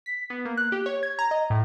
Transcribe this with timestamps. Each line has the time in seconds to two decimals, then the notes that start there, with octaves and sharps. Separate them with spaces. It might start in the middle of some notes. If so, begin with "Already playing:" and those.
0.06 B6
0.30 B3
0.45 A#3
0.57 F#6
0.72 G4
0.86 C#5
1.03 G#6
1.19 A#5
1.31 D#5
1.50 A2